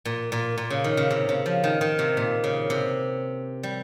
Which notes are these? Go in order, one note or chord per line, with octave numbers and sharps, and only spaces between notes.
A#2
A#2
A#2
C#3
D#3
C#3
C3
C#3
F3
D#3
D#3
C3
A#2
C#3
C3
G3